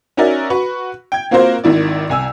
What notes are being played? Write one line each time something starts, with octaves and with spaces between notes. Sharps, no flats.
C#4 D#4 F#4 A#4 D5 E5
F#4 B4 C#6
G5 G#6
A#3 C4 F4 F#4 A#4 C5
G#1 D#3 E4 D5
C2 G#5 E6